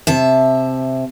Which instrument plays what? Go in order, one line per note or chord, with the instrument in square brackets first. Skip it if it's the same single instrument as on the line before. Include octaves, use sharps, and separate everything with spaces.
[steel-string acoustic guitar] C3 E5 A5